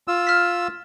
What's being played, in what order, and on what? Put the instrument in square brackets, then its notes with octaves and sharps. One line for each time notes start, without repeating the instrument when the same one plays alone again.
[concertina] F4 E6
[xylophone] F6 B6